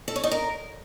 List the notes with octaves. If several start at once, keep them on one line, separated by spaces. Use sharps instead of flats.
A4
C#5
D#4
A#4